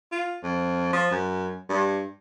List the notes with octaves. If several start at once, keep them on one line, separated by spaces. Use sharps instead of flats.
F4
F2
F3
F#2
G2